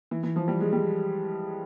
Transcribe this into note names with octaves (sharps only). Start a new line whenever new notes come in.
E3
E3
F3
G3
G#3
G3